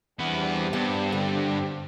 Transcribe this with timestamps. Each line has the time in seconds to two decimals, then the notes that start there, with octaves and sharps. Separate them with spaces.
0.19 E2 G3 B3 C4 D4
0.73 G2 B3 A5
1.12 D3